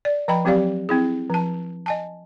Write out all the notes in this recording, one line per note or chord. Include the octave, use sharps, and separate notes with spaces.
D5
F3 D#5 G5 B5
F#3 C4 G4 D5 F5
C4 E4 G#4
F3 A5
D#5 G#5 A5